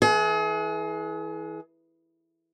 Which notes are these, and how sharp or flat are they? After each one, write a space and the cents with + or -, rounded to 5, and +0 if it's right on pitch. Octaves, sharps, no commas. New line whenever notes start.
E3 -20 G#4 +35